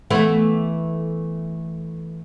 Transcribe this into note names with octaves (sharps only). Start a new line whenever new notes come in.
E3 A3 B3